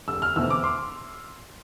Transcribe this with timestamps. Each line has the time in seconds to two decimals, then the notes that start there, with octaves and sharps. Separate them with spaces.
0.08 F1 E6
0.22 F6
0.36 E2 B2 A3 C4 E6
0.50 D6
0.64 C6